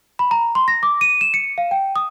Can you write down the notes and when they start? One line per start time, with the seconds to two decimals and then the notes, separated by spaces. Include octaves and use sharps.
0.19 B5
0.31 A#5
0.55 C6
0.68 A#6
0.83 D6
1.01 D#7
1.21 E7
1.34 C#7
1.58 F5
1.71 G5
1.96 D#6